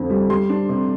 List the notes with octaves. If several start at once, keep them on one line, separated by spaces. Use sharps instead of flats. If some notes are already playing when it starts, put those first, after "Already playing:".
Already playing: F2 D3 C4
G3
G3 C6
D4
C3